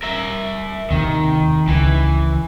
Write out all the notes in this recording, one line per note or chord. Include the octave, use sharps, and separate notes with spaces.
A#4 E5
D#2 C3 D#3
C#2 E3